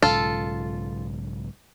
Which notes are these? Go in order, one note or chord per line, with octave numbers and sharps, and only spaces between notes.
B1 G#2 C#3 F4 A4